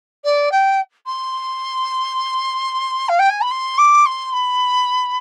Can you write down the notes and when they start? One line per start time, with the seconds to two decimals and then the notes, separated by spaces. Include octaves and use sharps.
0.24 D5
0.51 G5
1.06 C6
3.08 F5
3.19 G5
3.30 G#5
3.41 B5
3.51 C6
3.78 D6
4.05 C6
4.33 B5